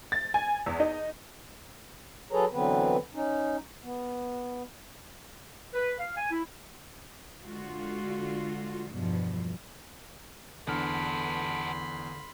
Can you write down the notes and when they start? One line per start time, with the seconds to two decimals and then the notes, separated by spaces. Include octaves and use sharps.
0.12 A6
0.34 G#5
0.66 E2
0.80 D#4
2.32 F#3 G#4 A4 B4 C#5 A#5
2.53 D3 E3 F#3 B3 C4 B4
3.15 C#4 D#4
3.83 B3
5.74 B4
6.00 F5
6.17 G#5
6.31 E4
7.44 D3 G#3 F4 F#4
8.91 E2 G2 B2 F3
10.67 E2 D3 B3 A4 B5 C6 F6